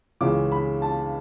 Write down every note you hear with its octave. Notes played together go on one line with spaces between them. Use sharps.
C#2 C#3 E3 D6
B5
A5